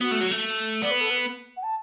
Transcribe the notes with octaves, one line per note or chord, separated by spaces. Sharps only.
B3 F#4
A3
F#3
A3
B3 D5
B4
A4
B4
F#5
A5